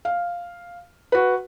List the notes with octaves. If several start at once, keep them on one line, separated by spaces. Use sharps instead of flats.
F5
F#4 B4